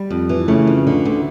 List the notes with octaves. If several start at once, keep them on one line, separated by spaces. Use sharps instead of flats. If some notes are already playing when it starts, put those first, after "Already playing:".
Already playing: G3
F2
E3
C#3 A3
F2
D3
D2